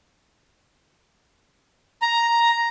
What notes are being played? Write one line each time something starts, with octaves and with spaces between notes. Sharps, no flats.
A#5